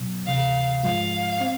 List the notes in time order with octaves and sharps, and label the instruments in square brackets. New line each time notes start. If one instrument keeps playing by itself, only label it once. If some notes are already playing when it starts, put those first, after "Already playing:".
Already playing: [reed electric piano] B2 F#3 B3
[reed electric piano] D2 C3 E3 [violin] F5
[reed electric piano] G#2 F3 G#3 [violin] F5
[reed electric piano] C4